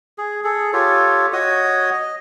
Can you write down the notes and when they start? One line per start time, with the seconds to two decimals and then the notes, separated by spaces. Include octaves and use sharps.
0.18 G#4
0.44 G#4 A4
0.73 F4 G4 A4 C#5
1.33 F#4 C#5 D#5 D#6
1.93 D#5